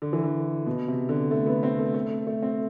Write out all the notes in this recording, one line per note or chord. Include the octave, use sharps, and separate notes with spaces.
D3
E3
D3
B2
C3
D3
A3
B3
C4
A3
A3
A3
C4